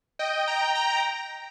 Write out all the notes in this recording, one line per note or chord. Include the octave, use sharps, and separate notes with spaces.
D#5 G5
G5 A#5
G5 A#5